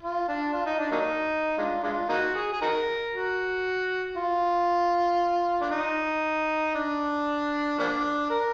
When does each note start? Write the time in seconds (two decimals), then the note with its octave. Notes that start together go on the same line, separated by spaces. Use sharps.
0.02 F4
0.28 D4
0.54 F4
0.66 D#4
0.79 D4
0.91 F#3 A#3 D#4
1.58 G#3 D4 F4
1.83 G#3 D4 F4
2.09 A#3 D#4 F#4
2.35 G#4
2.53 G#4
2.62 D#4 F#4 A#4
3.13 F#4
4.17 F4
5.62 D4
5.71 D#4
6.75 D4
7.79 F3 A#3 D4
8.30 A#4